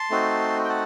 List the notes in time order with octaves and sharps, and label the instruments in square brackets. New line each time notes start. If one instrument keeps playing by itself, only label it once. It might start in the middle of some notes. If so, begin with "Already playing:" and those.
Already playing: [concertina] A5 C6
A3 C4 D#4 F#4
G5
F#5 A5